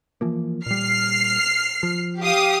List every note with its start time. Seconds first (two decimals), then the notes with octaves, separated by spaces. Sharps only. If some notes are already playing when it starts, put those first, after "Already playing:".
0.21 E3 F3 A#3
0.66 A#2 G3 F6 C7
1.83 F3
2.21 G4 F5 D#6